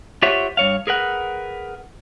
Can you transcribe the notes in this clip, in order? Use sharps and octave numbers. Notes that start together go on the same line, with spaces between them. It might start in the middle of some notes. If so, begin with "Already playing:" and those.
F4 G4 C5 C#5 E5 F#5
G2 C#5 F5
G#4 A#4 B4 F#5